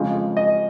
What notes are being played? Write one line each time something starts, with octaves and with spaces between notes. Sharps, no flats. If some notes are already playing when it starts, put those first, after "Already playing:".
Already playing: F2 C#3 F3 G#3
D#5